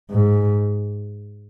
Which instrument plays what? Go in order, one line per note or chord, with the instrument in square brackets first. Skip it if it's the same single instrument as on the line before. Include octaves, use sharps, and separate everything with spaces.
[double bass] G#2